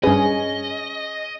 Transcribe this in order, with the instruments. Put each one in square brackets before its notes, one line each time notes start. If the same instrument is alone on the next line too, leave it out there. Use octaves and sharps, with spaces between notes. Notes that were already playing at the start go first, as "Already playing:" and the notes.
[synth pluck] G2 B4 [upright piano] C#4 [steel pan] G#4 [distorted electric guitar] D#5